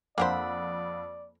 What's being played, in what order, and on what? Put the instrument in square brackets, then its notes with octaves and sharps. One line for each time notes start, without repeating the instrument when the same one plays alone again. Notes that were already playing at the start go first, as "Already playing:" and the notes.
[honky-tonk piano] F2 [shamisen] A#3 D4 C5 [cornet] D5 [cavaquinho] F#5 B5